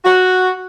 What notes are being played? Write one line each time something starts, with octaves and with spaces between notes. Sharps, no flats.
F#4